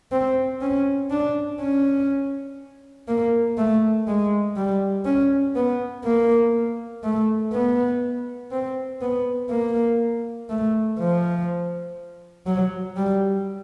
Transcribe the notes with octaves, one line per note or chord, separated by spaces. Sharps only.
C4
C#4
D4
C#4
A#3
A3
G#3
G3
C#4
B3
A#3
A3
B3
C4
B3
A#3
A3
F3
F#3
G3